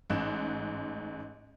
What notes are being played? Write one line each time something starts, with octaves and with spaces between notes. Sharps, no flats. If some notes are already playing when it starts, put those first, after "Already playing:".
A1 G#2 F#6 E7